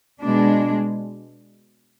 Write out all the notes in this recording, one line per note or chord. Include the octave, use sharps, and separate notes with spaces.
B2 G#3 D4